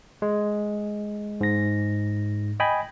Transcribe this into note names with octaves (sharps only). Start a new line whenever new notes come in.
G#3
G#2 A#6
D#5 G5 G#5 B5